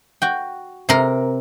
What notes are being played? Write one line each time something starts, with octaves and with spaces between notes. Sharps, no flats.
F#4 G5
C3 A#4